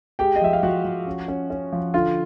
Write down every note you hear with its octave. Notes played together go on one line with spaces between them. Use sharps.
G#3 G4 G5
D#5
F3 E5
F5
F3 F#4 F#5
F3
C#4
C#4
C#4
F3
D3 F4 F5